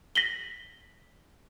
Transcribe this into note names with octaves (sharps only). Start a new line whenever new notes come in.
A#6 B6 F#7 G7